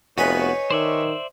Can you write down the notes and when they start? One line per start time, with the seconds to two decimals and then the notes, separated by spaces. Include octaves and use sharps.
0.18 F1 B3 D#4 F#4 B4 C#5 G#5
0.71 D#3 C5 D5 E5